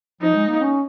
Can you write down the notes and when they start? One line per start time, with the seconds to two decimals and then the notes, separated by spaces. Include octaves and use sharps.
0.21 F3 D#4
0.34 G#3
0.48 A#3
0.61 C#4